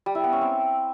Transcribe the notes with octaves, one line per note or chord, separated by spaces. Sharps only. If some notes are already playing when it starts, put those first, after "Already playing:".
G3
E4
B3
C#4
C4